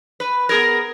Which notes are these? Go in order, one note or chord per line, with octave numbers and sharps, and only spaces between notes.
B4
B3 G#4 A#4